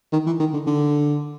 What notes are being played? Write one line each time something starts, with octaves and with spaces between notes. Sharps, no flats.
D#3
E3
D#3
D3
D3